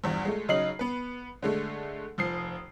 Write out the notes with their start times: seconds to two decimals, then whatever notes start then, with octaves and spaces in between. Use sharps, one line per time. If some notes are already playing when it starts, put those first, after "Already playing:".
0.04 A#1 E2 G2
0.25 G#3 A3
0.49 C#3 F#3 D#4 D#5 C7 F#7
0.79 B3 B4
1.42 D3 G#3 A3
2.18 F1 F3 D#6 C7